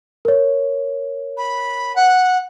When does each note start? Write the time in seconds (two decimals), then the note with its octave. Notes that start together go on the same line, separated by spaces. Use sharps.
0.25 A#4 C#5
1.37 B5
1.95 F#5